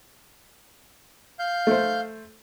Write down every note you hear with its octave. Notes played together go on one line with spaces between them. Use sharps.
F5 G6
A3 C5